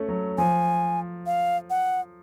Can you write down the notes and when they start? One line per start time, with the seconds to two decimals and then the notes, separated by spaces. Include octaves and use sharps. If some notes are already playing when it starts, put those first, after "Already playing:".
Already playing: A3 C#4
0.08 F#3
0.38 F3 G#5
1.26 F5
1.70 F#5